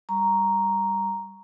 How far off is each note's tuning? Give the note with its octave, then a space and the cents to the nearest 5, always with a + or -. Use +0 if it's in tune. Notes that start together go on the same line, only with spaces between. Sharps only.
G3 +0 A#5 +0 C#6 +0